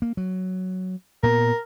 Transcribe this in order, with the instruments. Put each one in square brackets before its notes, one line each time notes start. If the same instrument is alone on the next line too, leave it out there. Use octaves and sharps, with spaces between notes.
[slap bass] A#3
F#3
[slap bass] A#2 B3 [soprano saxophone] A#4